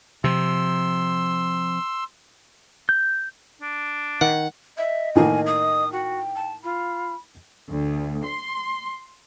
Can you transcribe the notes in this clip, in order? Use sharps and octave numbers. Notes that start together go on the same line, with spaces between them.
C3 F3 C6 E6
G6
D4
D#3 F#5
D#5 E5
A2 D#3 A#3 G#5
D#6
F#4 G5
A5
F4 B5
D2
C6